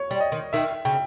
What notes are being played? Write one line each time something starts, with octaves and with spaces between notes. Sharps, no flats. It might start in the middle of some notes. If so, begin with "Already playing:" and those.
Already playing: C#5
G3
D#5
D#3
D#3 E5
C#3 G5